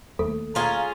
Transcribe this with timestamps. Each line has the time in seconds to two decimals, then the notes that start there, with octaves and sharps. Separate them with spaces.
0.19 D#2 A3 A4
0.55 C#4 F4 G#4 F5 A#5